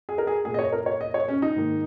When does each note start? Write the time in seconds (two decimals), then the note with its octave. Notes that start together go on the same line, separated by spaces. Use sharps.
0.09 G#4
0.18 A#4
0.27 G#4
0.45 A#2 A#3 G#4
0.54 D#5
0.59 C#5
0.72 A#4
0.86 C#5
1.01 D#5
1.14 C#5
1.28 C#4
1.42 D#4
1.56 G#2 D#3 A#3